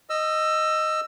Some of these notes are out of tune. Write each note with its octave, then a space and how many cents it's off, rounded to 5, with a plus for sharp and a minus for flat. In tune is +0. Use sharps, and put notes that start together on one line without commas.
D#5 +0 E6 +20